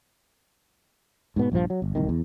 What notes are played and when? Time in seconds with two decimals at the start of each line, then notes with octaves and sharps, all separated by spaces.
1.36 G#2 B2 B3
1.52 A#1 G2 E3 F3
1.70 F#3
1.82 G1
1.95 D1 C2 D#3
2.09 E2